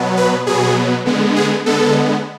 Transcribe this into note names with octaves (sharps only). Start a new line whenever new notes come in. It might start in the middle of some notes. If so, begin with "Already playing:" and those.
Already playing: B2 F#3 B3
B4
B2 F#3 B3 G#4
D3 G#3 B3
G#4
D3 G#3 B3 A4